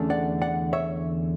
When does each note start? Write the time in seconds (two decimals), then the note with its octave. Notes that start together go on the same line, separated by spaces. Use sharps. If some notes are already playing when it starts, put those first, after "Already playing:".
Already playing: E2 D3 A3 C#4
0.10 D5 F#5
0.41 D5 F#5
0.73 C#5 E5